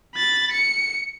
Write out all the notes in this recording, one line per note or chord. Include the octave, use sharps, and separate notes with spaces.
B5 A6
C#7